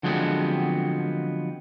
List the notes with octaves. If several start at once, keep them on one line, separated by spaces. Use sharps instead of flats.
D3 F3 F#3 G#3 B3 C4